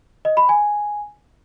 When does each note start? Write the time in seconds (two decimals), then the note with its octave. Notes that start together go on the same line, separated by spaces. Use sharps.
0.25 D#5
0.37 B5
0.49 G#5